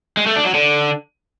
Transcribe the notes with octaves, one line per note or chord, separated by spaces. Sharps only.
G#3
A3
D4
F#3
D3